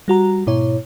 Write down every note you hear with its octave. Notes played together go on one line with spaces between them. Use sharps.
G3 F#4 A#5
G#2 B2 E4 C#5